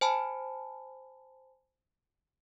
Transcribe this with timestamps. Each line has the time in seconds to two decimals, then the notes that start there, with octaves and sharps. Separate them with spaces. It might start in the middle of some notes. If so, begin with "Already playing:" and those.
0.01 C5 G#5 A5 B5